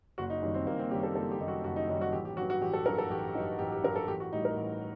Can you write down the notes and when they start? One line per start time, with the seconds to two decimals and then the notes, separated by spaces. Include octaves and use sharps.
0.18 F#1 F#4
0.30 D#4
0.42 F#2 D#3 G3
0.55 C4
0.67 F#1 A#3
0.79 C4
0.91 F#2 D#3 G3 G4
1.03 A4
1.15 F#1 A4
1.31 G4
1.40 F#2 D#3 G3 D#4
1.48 F#4
1.64 F#1 F#4
1.76 D#4
1.88 F#2 D#3 G3 D#4
2.01 F#4
2.13 A1 G4
2.25 G4
2.37 G2 F#3 F#4
2.50 F#4
2.61 A1 G4
2.73 A4
2.86 G2 F#3 A#4
2.98 A4
3.10 A1 G4
3.35 G2 F#3 D#4
3.59 A1 G4
3.72 G4
3.84 G2 F#3 A#4
3.96 A4
4.08 A1 G4
4.20 F#4
4.33 A2 G3 D#4
4.45 A#4
4.56 A1